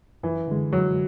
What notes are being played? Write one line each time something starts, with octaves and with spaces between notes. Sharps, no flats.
F#2 E3
D3 G#3
F#2 F#3